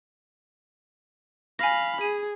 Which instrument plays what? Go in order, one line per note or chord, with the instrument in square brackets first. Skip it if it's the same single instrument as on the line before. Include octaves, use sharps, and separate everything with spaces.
[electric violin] F5 B5 [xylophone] G#5 A#6
[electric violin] G#4 [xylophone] D#7